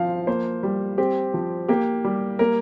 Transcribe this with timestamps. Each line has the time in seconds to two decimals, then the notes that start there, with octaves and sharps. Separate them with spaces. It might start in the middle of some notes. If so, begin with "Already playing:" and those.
Already playing: F3 C4 F5
0.27 A#3 C5
0.63 G3
0.98 C4 G4
1.34 F3
1.69 A#3 G4
2.05 G3
2.39 A#3 A#4